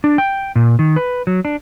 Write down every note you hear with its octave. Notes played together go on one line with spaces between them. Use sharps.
D4
G5
A#2
D#3
B4
F#3
D4